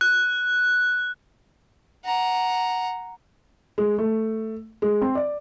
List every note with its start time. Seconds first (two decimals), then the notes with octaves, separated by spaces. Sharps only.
0.01 F#6
2.04 F#5 A#5
3.78 G#3
3.98 A3
4.82 G#3
5.02 C4
5.15 D5